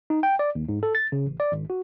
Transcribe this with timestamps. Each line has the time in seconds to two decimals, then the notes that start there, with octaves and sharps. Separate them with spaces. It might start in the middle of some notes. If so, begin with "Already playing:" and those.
0.10 D#4
0.23 G5
0.39 D5
0.55 D#2
0.69 G#2
0.83 A4
0.95 A6
1.12 C#3
1.26 A1
1.40 D5
1.52 G#1
1.70 F#4